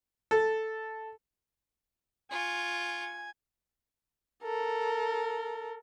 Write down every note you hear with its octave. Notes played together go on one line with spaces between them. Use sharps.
A4
F4 G#5 C#6
A4 A#4